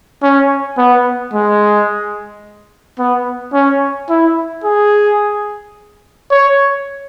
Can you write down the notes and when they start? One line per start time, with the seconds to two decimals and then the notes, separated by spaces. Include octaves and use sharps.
0.23 C#4
0.78 B3
1.34 G#3
2.99 B3
3.54 C#4
4.10 E4
4.64 G#4
6.31 C#5